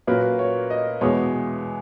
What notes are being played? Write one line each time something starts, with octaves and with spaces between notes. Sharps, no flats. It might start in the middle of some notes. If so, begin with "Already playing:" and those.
A#2 F#3 A#3 C#4 B4
C#5
D#5
E2 B2 G#3 B3 C#5